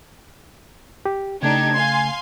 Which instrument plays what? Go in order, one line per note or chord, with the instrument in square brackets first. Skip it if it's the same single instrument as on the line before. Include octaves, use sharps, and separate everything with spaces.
[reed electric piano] G4
[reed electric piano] C#3 A3 [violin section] D4 D#4 G4 [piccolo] G#6
[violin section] F5 G#5 C6